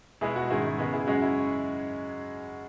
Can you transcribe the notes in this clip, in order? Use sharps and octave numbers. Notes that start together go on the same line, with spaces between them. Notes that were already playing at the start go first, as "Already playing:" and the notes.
B2 G#3 B3 E4 G#4
F#4
G#2 D#3 G#3 C#4 E4
C#3 G#3 B3
E4 G#4
F#2 C#3 G#3 C#4 F#4
E4